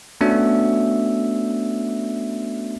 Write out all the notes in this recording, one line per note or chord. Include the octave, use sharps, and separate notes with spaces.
A3 B3 C#4 D4 F#4 E5